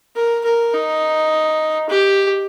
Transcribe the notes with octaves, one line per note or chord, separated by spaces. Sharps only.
A#4
A#4
D#4
G4